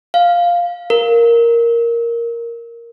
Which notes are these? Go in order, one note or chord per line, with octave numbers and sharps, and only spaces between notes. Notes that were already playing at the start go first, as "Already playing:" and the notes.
F5
A#4